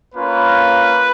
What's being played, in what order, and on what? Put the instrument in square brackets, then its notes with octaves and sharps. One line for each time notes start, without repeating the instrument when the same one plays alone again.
[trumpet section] A#3 C#4 F4 B4